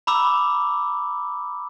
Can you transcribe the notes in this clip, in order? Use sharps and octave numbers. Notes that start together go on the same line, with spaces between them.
A#5 B5 D6 E6